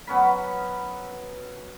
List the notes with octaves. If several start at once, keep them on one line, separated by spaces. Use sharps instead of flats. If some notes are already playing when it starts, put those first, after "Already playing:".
F#3 B3 C#4 B5